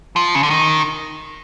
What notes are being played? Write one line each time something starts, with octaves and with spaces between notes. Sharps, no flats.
F3
C#3
D3
D#3